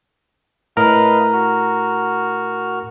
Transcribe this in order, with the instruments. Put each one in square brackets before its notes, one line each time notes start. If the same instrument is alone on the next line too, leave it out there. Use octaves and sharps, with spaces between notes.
[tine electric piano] A2 A#4 A#5 [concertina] B4 D#5 F5
[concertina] F#4 F6